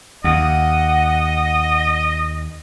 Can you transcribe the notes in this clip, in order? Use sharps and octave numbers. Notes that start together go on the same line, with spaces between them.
D#2 D#5 F#5